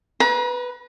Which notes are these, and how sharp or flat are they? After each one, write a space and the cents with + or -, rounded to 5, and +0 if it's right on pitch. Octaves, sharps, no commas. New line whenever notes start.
B4 +0 A#5 +45